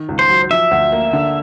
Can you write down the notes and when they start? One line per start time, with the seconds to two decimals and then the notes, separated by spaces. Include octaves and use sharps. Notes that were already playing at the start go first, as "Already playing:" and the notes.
Already playing: D#3
0.09 C#2
0.19 C5
0.29 F#3
0.50 F3 E5
0.71 D2
0.92 A#3
1.13 D3